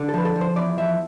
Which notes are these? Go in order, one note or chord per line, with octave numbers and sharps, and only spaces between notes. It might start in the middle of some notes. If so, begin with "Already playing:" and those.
Already playing: D3
A4
F3 B4
A4
F3
C5
E2 D5
F3 E5